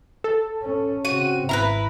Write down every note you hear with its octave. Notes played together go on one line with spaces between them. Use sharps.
A4
C#4
C#3 C4 F#4 D#7
G#1 E4 A#4 B4 A#5